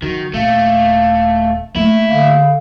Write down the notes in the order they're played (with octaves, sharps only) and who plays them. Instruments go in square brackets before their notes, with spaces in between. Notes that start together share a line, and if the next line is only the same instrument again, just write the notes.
[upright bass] F#2 [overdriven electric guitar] D#3 [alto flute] F#4
[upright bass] D#1 [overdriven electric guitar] A3 [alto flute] F5
[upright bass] A3 A#3 [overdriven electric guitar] E4
[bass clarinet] D3 [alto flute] F5